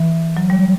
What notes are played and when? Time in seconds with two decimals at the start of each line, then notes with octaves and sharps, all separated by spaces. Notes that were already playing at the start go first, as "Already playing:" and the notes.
Already playing: E3
0.37 F#3
0.50 G3